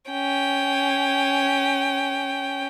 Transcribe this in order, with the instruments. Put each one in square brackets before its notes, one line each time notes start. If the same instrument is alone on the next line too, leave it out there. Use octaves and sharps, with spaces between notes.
[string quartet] C#4 G5